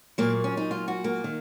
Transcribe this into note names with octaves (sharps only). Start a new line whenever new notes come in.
A#2 F#3 A#3
C#4
D#4
F4
F#4
A#3
D#3